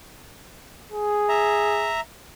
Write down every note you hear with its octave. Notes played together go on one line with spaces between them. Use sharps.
G#4
E5 A#5